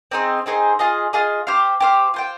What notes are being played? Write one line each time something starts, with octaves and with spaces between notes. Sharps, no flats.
C4 D#4 G#4 C5
C4 D#4 G#4 C5
F4 G#4 D#5
F4 G#4 D#5
G4 C5 F5
G4 C5 F5
F4 C5 G5